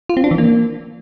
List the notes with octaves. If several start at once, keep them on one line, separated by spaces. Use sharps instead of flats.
F4
C4
D4
E3
A#3